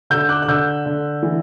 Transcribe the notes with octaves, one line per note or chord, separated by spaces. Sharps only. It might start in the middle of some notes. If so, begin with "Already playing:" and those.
D3 E6 G6
D6 F#6
F#6
D3 E6 G6
D3
E3